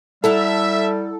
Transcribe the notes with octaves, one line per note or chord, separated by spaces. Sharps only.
G3 E4 A4 E5 F#5 A#5